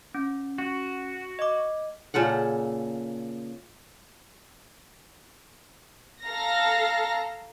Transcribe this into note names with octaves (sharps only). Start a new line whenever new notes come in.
C#4
F#4
D#5 D6
A#2 C#3 A4 F#5
A4 F5 A#5 A#6